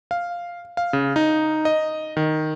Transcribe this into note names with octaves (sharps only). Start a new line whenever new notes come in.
F5
F5
C#3
D#4
D#5
D#3